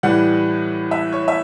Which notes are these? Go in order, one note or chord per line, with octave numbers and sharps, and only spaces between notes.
A2 E3 G3 F#5
E5
C#5
E5